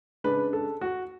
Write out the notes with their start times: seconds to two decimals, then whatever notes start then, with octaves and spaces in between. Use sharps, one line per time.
0.24 C#3 G#3 D4 B4
0.53 A4
0.81 F#4